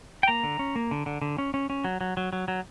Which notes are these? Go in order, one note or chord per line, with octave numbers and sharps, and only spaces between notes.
G5
A#3 A#5
D3
C#4
A#3
D3
D3
D3
C#4
C#4
C#4
F#3
F#3
F#3
F#3
F#3